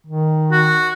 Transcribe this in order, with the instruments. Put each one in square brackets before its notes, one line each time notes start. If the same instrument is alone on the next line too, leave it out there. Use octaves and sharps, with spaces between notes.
[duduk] D#3
[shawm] F#4